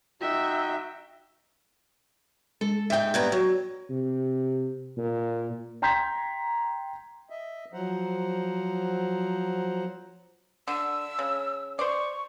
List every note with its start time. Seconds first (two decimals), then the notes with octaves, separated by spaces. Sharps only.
0.21 D#4 F#4 E5 G5
2.61 G#3 A4
2.90 G#2 D#4 E5 G5
3.14 G2 B3 A#5 G#6
3.32 F#3
3.90 C3
4.97 A#2
5.82 G5 A#5 C6 G6 G#6 B6
7.30 D#5 E5
7.74 F3 F#3 C5 F#5 A#5
10.68 D3 E6
11.19 C#3
11.79 C5 D5 C#6